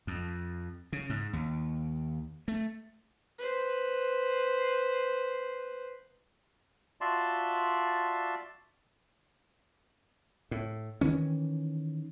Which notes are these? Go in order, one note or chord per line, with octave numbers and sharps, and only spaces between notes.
F2
C#3
G#2
D#2
A3
B4 C5
F4 F#4 D5 E5 A5 C6
A2
D#3 E3 C#4